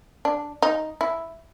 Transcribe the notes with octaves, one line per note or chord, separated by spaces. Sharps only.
D4
D#4
E4